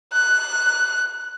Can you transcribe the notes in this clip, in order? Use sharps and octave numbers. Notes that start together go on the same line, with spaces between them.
F#6